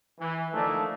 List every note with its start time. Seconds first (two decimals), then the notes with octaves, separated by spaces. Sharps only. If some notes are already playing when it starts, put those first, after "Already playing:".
0.19 E3
0.54 D3 F3 A3 A#3 D4 D#4